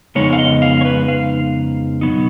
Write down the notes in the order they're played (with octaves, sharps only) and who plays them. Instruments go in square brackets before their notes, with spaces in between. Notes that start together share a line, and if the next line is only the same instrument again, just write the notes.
[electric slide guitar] F2 C#3 G#3 B3 D#4 C#5
F5
D#5
F5
C#5
B4
F5
B2 F#3 B3 D#4